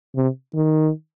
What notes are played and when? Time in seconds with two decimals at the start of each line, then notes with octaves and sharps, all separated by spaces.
0.16 C3
0.55 D#3